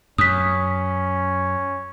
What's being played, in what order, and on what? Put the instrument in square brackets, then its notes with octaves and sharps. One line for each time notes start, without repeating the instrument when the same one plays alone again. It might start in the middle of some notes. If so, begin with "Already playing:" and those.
[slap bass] F#2 [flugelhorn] C#4 [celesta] D#6 B6